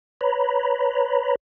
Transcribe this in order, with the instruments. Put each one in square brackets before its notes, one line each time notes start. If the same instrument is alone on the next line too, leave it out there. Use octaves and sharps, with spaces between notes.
[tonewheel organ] B4 C#5 A#5 B5